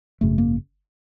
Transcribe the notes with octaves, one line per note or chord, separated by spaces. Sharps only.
G#1 F#2 C#3 A3
A#3